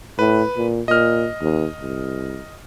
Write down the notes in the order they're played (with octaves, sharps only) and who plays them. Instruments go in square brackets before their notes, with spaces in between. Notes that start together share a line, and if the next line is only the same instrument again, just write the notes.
[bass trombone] A2 [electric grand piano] B4
[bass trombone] A#2
[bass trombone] A#2 [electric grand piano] D#5 F6
[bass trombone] D#2
C2